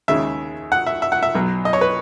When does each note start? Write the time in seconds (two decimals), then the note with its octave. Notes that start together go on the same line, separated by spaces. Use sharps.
0.08 D#2 C#3 G#3 E5
0.72 F#5
0.87 E5
1.02 E5
1.12 F#5
1.23 E5
1.35 B1 B2 F#3
1.65 D#5
1.73 C#5
1.81 B4